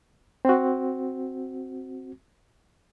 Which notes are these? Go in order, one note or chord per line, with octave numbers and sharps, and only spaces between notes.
C4 F#4